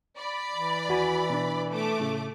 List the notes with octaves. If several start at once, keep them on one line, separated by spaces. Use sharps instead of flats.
D5 B5
E3
D#2 F#4 G#5
B2 D4
A3 D6
A2 C#3